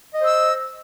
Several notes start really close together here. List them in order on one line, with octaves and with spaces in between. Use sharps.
D#5 C5 E6